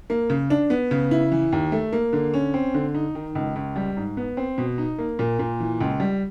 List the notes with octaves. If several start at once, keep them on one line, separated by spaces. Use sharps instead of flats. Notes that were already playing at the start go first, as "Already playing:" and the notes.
A#3
C#3
D4
B3
C#3
E4
E3
D#2
A3
A#3
D3
C#4
C4
D3
D#4
D#3
C#2
C#2
G3
G#2
B3
C4
B2
D#4
A#3
A#2
A#2
E3
C#2
G3